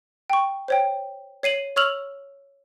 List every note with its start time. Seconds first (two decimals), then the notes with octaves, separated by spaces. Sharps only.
0.30 G5 C#6
0.68 C5 C#5 G5
1.43 C#5 C7 D#7 F#7
1.76 C#5 C#6 E6 F6 F7 F#7